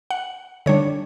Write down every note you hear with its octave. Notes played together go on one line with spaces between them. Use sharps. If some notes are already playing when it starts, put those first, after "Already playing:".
F#5
D3 G3 D4 C#5